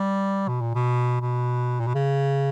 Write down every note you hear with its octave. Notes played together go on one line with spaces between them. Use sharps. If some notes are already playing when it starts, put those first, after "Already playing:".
Already playing: G3
B2
A#2
B2
B2
A#2
B2
C#3